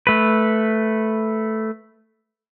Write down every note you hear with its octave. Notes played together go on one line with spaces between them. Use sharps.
A3 B4